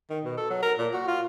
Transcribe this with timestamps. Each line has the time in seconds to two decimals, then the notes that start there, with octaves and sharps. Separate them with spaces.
0.10 D#3
0.25 B2
0.37 A4
0.50 F#3
0.63 A#4
0.78 A#2
0.93 F#4
1.08 F4